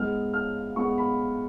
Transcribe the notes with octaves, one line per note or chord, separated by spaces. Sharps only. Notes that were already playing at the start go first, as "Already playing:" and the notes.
Already playing: G#2 G#3 B3 F6
F6
G#2 G#3 B3 C#6
B5